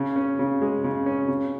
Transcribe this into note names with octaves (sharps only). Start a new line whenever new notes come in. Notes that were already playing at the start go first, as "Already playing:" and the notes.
Already playing: C#3
C#4
C#3
G#3
C#3
C#4
C#3